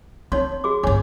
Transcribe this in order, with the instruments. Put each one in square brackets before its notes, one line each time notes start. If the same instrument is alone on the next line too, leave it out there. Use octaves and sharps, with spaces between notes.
[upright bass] C4 [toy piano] D#4 C#5 C6
[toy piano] F#4 G#4 D6
[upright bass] G1 F2 [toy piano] C#5 G#5 D6